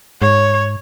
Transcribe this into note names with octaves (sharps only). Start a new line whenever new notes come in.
G#2 C#5